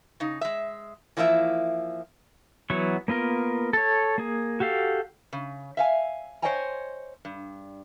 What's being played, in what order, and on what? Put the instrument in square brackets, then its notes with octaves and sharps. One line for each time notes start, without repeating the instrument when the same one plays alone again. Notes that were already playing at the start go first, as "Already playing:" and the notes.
[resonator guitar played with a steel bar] C#3 D#4
G#3 E5
E3 F3 A#3 E4 E5
[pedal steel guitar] E3 F#3 B3 C#6
A#3 B3 F4 A#4
A4 C#5
A#3 G#4
F#4 G4 A4 F5
[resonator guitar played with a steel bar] C#3
E5 F5 G#5
C5 C#5 D#5 G5 G#5 A#5
G2